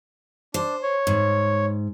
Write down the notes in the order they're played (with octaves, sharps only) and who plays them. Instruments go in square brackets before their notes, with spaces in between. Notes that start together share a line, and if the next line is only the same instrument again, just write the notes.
[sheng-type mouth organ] D4 [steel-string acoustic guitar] C5
[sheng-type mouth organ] C#5
[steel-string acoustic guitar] G#2